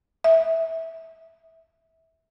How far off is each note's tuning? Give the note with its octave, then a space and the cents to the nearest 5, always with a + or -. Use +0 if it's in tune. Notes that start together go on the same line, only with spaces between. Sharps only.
E5 -20